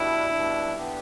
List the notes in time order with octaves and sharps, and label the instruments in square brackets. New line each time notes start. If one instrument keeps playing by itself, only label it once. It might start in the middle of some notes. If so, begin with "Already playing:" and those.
Already playing: [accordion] B2 G3 D4 [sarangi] E4
[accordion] B2 G3 D4
D3 B3 D4 G4